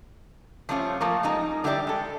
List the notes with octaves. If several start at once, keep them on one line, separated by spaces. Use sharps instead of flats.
F3 G3 A3 C#4 F4
F3 A3 A#3
G3 G#3 D#4
D3 G3 E4 G4 A#4 D5
G#3 A4